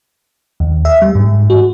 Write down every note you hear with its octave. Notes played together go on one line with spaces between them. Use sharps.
D#2
E5
G3
G#2
F#4